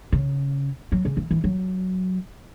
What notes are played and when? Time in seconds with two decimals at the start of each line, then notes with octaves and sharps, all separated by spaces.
0.12 C#3
0.92 F#3
1.05 C#3
1.17 E3
1.31 E3
1.44 F#3